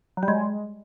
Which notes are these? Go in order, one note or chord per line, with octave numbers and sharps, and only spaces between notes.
F#3
G3
G#3